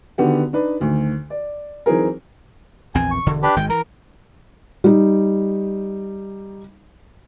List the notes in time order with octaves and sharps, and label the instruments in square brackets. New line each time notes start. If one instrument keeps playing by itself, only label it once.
[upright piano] D3 D#3 B3 F#4 G4
D4 D#4 B4
D2 D#3
D5
E3 F#3 C4 D#4 G#4 A#4
[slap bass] A#1 E2 C4 [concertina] G#5
[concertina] C#6
[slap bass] E1 D3
[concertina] D4 G4 B4
[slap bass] G#1 D#3 G#3 [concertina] G5
[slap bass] E3 [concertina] A#4
[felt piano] G3 D#4